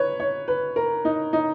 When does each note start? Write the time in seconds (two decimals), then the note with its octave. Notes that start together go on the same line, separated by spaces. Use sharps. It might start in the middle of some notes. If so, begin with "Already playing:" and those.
Already playing: B4 C#5
0.20 C#5
0.48 B4
0.76 A#4
1.05 D#4
1.33 D#4